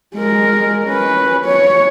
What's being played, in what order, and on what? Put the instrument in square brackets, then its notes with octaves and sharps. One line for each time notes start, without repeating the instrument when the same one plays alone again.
[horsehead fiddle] G#3 A#4
C#4 B4
C#5